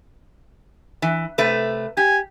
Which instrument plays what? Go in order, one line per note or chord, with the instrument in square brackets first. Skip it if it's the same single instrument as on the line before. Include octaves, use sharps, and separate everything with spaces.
[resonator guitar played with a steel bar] E3
C3 A3 B4
[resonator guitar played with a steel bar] G4 [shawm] G#5